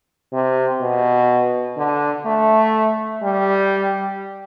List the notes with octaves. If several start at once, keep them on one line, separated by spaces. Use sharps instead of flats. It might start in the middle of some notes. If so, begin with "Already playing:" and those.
C3
B2
D3
A3
G3